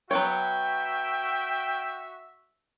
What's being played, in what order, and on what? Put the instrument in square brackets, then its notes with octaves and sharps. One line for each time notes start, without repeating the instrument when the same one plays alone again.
[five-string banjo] F#3 B3 C#5 [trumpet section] F#4 E5 [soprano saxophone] G5